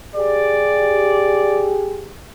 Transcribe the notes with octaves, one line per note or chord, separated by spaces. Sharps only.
G4 G#4 D5